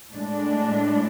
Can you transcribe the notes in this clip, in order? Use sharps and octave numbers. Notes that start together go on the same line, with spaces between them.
A2 G#3 D4